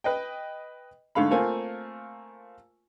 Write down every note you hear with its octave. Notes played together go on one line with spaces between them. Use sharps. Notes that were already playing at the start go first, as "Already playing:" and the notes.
B4 D#5 G5
G#2 D3 A3 F5 B5
A3 A#3 C4 F4 A#4 G#5